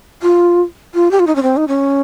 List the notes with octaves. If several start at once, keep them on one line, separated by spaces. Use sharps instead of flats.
F4
F4
G4
F4
D#4
C#4
C4
D#4
C#4